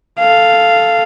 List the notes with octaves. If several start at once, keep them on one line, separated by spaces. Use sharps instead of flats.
A4 F5